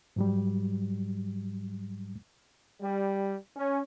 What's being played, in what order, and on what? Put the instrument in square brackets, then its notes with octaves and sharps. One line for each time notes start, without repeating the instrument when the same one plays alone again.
[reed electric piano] G#2 F#3 G3
[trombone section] G3
C#4